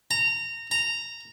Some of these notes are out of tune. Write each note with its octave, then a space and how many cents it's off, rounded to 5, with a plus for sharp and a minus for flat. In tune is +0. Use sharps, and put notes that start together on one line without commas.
A#5 -20
A#5 -10